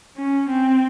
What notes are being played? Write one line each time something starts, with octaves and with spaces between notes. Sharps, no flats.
C#4
C4